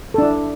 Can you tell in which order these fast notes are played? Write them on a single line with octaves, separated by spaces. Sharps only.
A4 D4 E4